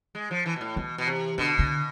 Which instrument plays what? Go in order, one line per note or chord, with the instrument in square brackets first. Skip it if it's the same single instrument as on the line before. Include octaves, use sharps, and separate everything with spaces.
[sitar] G#3
F3
E3
B2
A2
[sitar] B2 [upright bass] E3
[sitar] B2
C3
[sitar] B2 [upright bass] D3
[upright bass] D3